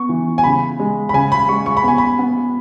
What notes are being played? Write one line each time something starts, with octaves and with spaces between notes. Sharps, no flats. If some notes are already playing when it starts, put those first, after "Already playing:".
Already playing: B3 C#6
E3
G#5
C#3 B5
G#3
B5
C#3 G#5
B5
G#3 C#6
C#6
B5
B3 G#5
B5
B3